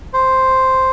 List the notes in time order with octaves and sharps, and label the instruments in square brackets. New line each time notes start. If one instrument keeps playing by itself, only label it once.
[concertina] C5